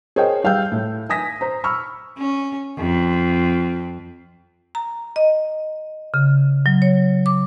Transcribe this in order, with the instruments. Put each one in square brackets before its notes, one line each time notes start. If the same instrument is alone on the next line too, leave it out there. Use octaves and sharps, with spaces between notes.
[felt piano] G#4 A#4 C5 C#5 D#5 G5
G3 F5 G5 E6 G6
A2
G#5 D#6 A#6 B6
C5 A#5
B5 C#6 E6 F6
[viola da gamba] C#4
F2
[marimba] A#5
D#5
C#3
F#3
C#5
D6